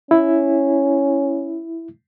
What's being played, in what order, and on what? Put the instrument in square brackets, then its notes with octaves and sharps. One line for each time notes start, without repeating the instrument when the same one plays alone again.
[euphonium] C#4 [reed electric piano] E4